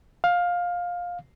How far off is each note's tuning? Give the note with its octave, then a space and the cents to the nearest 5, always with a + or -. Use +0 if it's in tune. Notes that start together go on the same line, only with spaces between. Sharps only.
F5 +15